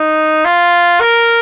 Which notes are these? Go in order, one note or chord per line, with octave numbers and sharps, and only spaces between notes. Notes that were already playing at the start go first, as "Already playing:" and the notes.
Already playing: D#4
F4
A#4